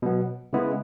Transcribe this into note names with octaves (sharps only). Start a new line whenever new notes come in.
B2 F#3 B3
C#3 G#3 B3 E4